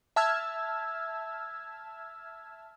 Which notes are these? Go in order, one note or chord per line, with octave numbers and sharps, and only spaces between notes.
E5 A5 E6 F6 G#6